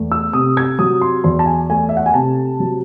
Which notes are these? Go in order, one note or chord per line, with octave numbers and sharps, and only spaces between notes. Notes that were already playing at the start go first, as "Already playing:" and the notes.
Already playing: E2 A3
E6
C3 D#6
G#6
F#3 D#6
C6
E2 C6
A5
G#5
A3 G#5
E5
F#5
G#5
C3 A5
F#3